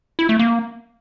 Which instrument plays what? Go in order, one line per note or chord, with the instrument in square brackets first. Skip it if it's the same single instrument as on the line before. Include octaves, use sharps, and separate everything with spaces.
[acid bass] E4
A3
A#3